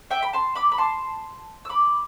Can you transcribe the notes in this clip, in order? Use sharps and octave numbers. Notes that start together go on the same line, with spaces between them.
E5 G5
B5
A5 C6
B5 D6
B5
A5 C6
E6
B5 D6